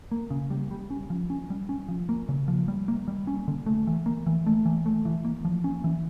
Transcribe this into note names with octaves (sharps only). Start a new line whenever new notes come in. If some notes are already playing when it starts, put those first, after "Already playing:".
A#3
C#3
G3
G3
C#4
F3
C#4
G3
C#4
F3
A#3
C#3
F3
G3
A#3
G3
C#4
D3
A3
E3
A#3
E3
A3
E3
A3
E3
A#3
F3
C#4
E3